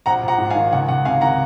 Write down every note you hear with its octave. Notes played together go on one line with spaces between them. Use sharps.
A#1 F#5 A#5
A#1
F#5 A#5
G#2
F5 G#5
D#3
C#2 F#5
C#2 F#5
C3 F5 G#5
D#3 F#5 A#5